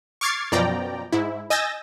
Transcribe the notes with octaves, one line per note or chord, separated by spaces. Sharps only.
C#6 D6 F6 G#6 A6 C7
F#2 B2 F3 D5 G5 A#5
G#2 E4
D#5 G#5 E6 G6 A6 A#6